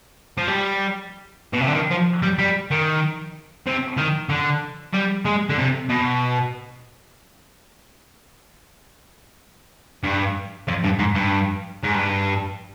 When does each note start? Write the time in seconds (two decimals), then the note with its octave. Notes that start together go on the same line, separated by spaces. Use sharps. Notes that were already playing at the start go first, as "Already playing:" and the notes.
0.38 F3
0.48 G3
1.53 B2
1.61 C3
1.67 D3
1.75 D#3
1.91 F3
2.22 G3
2.38 G3
2.71 D#3
3.67 C3
3.98 D#3
4.29 D3
4.93 G3
5.25 G#3
5.50 D3
5.58 C3
5.89 B2
10.03 G2
10.68 F2
10.84 G2
10.99 G#2
11.15 G2
11.84 G#2
11.94 G2